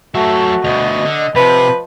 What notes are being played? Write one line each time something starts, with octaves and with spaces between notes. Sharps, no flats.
F#3 A3 F#4 E5
D2 B2 D#5
D3
C3 F3 B4